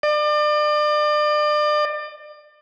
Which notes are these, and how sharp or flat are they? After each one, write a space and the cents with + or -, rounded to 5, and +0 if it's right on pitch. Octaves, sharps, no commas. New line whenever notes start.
D5 +35